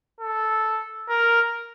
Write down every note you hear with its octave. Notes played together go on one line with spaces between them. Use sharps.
A4
A#4